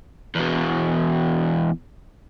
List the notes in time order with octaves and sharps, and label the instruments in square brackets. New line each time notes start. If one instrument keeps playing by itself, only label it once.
[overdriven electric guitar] E2 B2